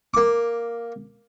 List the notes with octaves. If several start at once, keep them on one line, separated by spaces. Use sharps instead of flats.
A#3 D6